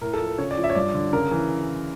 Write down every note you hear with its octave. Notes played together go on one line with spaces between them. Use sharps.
A2 A#4
A4
F3
A#4
C#3 C#5
D5
F3
E5
C#5
G2 D5
D3
C#3 A#4
E3